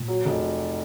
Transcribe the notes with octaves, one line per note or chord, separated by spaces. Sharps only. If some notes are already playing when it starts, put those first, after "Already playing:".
Already playing: A#2
F#3
F1